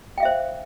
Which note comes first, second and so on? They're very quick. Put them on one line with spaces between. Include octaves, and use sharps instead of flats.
G5 F5 E5 C5